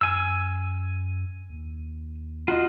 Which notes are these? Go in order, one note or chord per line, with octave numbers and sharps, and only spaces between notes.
F#2 G#5 E6
D#2
F4 F#4 D#5